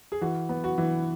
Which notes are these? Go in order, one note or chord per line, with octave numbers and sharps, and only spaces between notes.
G#4
E3 F#4
B3
F#4
E3